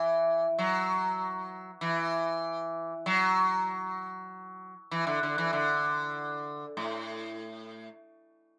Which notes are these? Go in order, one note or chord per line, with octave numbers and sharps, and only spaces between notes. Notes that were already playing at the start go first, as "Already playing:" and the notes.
Already playing: E3
F#3
E3
F#3
E3
D3
D3
E3
D3
A2